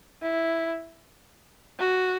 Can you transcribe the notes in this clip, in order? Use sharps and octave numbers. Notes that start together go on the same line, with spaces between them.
E4
F#4